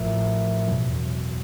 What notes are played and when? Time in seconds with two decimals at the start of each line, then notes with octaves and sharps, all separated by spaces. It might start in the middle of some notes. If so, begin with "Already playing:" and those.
Already playing: A1 A2 F3 A#4 E5
0.68 E2 B2 F#3